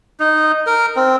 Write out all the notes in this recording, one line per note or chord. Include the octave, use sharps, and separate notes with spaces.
D#4
A#4
C4